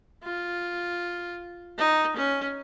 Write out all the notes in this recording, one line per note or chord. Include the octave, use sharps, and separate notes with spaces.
F4
D#4
C#4